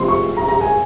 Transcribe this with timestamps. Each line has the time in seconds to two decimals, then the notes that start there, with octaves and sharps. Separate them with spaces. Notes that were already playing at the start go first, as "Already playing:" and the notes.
Already playing: C3 F3 G#3 C4 C6
0.08 C#6
0.37 A#5
0.48 A#5
0.61 G#5